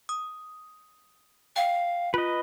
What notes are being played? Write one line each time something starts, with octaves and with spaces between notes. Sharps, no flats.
D#6
F5 G5
F4 B4 D#5